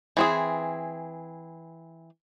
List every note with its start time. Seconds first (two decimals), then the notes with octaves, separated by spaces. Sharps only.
0.17 E3 C4 G#4